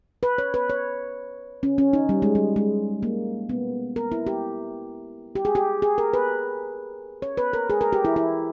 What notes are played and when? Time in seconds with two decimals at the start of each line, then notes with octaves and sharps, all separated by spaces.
0.23 B4
0.38 C#5
0.54 B4
0.70 C#5
1.63 C#4
1.78 C#4
1.93 D#4
2.09 G3
2.22 G#3
2.35 G3
2.56 G#3
3.03 A#3
3.49 B3
3.96 A#4
4.12 E4
4.27 G4
5.35 G4
5.45 G#4
5.55 G4
5.82 G#4
5.98 A#4
6.13 B4
7.22 C#5
7.37 B4
7.53 A#4
7.70 G#4
7.81 A#4
7.93 G4
8.05 E4
8.16 E4